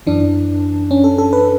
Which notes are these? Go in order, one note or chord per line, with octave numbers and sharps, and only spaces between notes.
F#2 E3 D4
C#4
A4
A4
B4